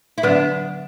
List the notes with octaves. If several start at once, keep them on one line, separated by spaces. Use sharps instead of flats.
E4
D3 F#3 B3 D4